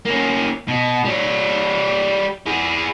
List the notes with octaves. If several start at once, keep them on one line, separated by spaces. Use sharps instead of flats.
A#3 C#4
B2
G3 C#5
E4 G#4